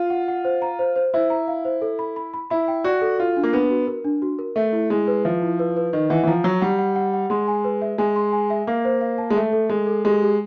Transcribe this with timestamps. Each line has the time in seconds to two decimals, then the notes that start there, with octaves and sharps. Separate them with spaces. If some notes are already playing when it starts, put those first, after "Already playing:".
Already playing: F4
0.10 F#5
0.28 F#5
0.45 C5
0.62 A#5
0.79 C5
0.96 C5
1.13 E4 C5
1.30 A#5
1.48 F5
1.65 C5
1.82 A4
1.99 B5
2.16 B5
2.34 B5
2.50 E4 B5
2.68 G5
2.84 F#4 D5
3.01 A4
3.18 F4 F#4
3.37 D4
3.43 A#3
3.53 B3 D4
3.70 F#4
3.87 A#4
4.05 D4
4.22 F#4
4.39 A#4
4.56 A3 E5
4.73 E4
4.90 G#3 E4
5.08 B4
5.25 F3 E5
5.42 E4
5.59 B4
5.77 B4
5.93 D#3 D#5
6.10 E3 F#5
6.23 E3
6.27 F3 A#5
6.44 F#3 A#5
6.62 G3 F#5
6.79 F#5
6.96 F#5
7.14 F#5
7.30 G#3 C6
7.48 G#5
7.65 B4
7.82 E5
7.98 G#3 G#5
8.16 C6
8.32 G#5
8.50 E5
8.67 A#3 F5
8.85 C5
9.01 F5
9.18 A5
9.30 G#3
9.36 A3 A5
9.53 A4
9.70 G#3 A4
9.87 A4
10.05 G#3 G4
10.22 G4